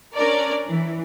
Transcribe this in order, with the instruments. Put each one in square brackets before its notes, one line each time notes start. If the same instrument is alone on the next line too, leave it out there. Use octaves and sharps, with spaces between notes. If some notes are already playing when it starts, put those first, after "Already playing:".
[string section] C#4 D4 A#4 D5
E3